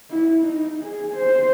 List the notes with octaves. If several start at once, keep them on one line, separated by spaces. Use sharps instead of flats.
E4
D#4
G#4
C5